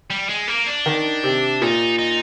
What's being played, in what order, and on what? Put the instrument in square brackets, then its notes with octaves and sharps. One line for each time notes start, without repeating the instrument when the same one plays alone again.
[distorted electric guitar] G3
G#3
A#3
D4
[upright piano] D#3
C3
[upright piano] A#2 [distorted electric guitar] D#4
[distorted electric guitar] D#4